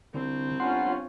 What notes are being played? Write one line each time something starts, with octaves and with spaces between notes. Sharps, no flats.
C2 D3 C4
G1 C#4 F4 F#5 C6